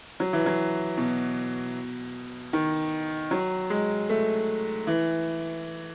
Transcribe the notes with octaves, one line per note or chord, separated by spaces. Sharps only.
F#3
E3
F#3
B2
D#3
F#3
G#3
A3
E3